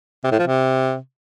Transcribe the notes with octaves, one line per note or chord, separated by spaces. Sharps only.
C3
A2
F3
C3